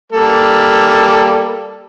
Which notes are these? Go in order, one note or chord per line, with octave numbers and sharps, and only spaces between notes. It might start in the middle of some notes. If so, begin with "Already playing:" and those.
G3 A#3 A4